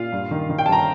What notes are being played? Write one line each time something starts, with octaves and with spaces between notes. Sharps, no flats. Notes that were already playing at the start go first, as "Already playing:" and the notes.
Already playing: A#2 F4 F5
G2
D#3
D#3
G5
A5
G1 A#5